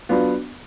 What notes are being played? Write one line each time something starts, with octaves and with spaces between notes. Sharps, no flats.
F#3 B3 D4 F4